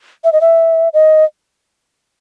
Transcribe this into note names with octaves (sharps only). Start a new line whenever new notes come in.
E5
D#5
E5
D#5